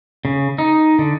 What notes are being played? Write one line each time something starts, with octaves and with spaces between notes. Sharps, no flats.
C#3
D#4
D3